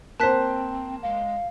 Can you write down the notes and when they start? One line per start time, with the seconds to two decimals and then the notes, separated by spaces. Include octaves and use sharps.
0.20 A#3 C4 C5 A5 F#6 B6
1.03 G#3 F5